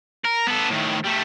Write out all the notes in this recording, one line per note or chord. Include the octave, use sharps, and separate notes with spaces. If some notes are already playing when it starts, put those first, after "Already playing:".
A#4
B3 A4
A2 D#3
G3 A3